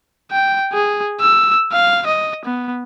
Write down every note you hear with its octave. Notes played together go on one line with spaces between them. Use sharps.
G5
G#4
E6
F5
D#5
B3